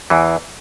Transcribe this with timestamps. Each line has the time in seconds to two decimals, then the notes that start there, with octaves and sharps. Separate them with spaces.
0.10 E2 E3